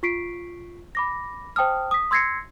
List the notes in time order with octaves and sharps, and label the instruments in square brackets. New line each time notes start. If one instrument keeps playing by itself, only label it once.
[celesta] F4 C#6 B6 C7 D7
B5 D6 A#6
C5 G5 A5 D#6 F6
D#6 B6
C6 E6 G#6 A#6 C7 C#7